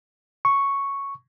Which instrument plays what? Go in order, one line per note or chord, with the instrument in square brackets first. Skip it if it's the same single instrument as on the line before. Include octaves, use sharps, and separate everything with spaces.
[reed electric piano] C#6